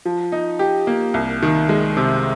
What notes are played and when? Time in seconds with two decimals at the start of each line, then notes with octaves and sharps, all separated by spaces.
0.05 F3
0.32 D#4
0.59 G4
0.87 A#3
1.14 C2
1.42 D#3
1.69 G#3
1.97 C3